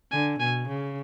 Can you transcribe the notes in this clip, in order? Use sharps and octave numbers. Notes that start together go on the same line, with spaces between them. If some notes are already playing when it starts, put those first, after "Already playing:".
D3 G#5
B2 G#5
C#3